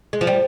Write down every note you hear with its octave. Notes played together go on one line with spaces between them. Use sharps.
G#3
F3
G3